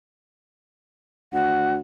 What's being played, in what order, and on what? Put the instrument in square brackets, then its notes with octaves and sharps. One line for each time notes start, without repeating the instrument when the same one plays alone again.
[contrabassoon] D2 [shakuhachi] F#5